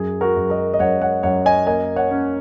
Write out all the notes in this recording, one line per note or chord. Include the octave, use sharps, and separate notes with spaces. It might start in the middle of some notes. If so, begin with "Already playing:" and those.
Already playing: F#2 G#4
F#4 A#4
F#2
A#4 D#5
D#5
F#2 C#5 F#5
C#5 F#5
F#2 C#5 F#5
D#5 G#5
A#3 D#5 G#5
C#5 F#5
C#4